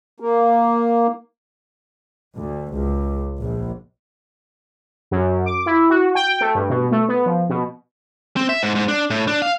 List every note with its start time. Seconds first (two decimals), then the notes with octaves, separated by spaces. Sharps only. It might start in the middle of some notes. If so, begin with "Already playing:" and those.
0.20 A#3
2.36 D2
2.74 C#2
3.40 A#1
5.11 F#2
5.46 D6
5.66 E4
5.90 F#4
6.15 G5
6.41 A3
6.55 G2
6.70 B2
6.91 A3
7.08 B3
7.26 F3
7.49 B2
8.36 C4
8.49 E5
8.63 G#2
8.75 G#2
8.88 D4
9.10 A2
9.28 D4
9.42 F5